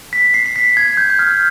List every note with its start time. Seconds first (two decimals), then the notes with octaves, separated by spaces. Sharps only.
0.13 B6
0.34 C7
0.46 C7
0.56 B6
0.77 G#6
0.97 G6
1.10 G6
1.19 F6